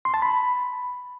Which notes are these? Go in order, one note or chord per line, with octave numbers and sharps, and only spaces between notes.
C6
A5
B5